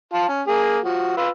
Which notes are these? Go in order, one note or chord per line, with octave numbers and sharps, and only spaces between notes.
F4 A5
C#4
A#3 G#4
F3 F#4
F4 B4 E6